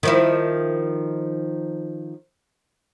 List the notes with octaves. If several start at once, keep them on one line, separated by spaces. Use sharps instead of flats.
D#3 F3 E4